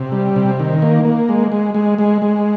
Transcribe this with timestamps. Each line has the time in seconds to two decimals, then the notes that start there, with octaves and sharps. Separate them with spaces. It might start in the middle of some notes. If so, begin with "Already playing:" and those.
Already playing: C3
0.12 G3
0.36 C3
0.59 D#3
0.82 A#3
1.05 A#3
1.29 G#3
1.52 G#3
1.75 G#3
1.98 G#3
2.22 G#3